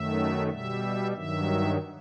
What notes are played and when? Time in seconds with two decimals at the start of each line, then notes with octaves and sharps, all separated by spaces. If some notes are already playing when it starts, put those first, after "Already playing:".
Already playing: F#2 D#3 F#3 A3 E5
0.49 B2 G3 E5
1.13 G2 D#3 F#3 E5